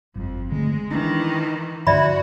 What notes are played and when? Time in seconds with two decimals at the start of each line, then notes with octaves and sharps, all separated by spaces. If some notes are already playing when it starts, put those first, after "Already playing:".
0.15 G1 F2
0.52 D3 G#3 A3
0.91 D#3 E3 C#4 D4
1.87 G2 D3 F3 F#4 D5 E5 B5